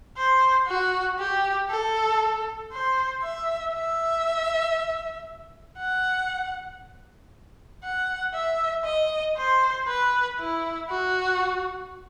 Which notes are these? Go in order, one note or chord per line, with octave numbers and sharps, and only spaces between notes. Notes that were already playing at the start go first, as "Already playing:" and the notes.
C5
F#4
G4
A4
C5
E5
E5
F#5
F#5
E5
D#5
C5
B4
E4
F#4